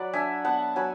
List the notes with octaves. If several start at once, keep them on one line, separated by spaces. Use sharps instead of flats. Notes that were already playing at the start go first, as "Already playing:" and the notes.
Already playing: F#3 B4 D5 F#5
D4 E5 G#5
B3 F#5 A5
F#3 G#5 B5